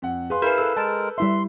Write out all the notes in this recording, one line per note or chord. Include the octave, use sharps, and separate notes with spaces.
F2 F#5
G#4 B4 F5 C6
E4 G#4 A#4 B4 F5 G6
A4 B4 E6
G#3 A#4 A5
G3 E4 E5 C6